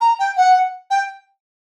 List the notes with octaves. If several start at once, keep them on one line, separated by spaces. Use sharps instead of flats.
A#5
G5
F#5
G5